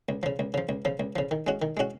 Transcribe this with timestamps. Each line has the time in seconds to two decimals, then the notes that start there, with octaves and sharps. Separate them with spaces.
0.09 C#2
0.23 C#3 F3
0.39 C#2
0.54 C#3 F3
0.69 C#2
0.85 C#3 F3
1.00 C#2
1.16 C#3 F3
1.31 D#3
1.47 G#3 C#4 F#4
1.62 D#3
1.77 G#3 C#4 F#4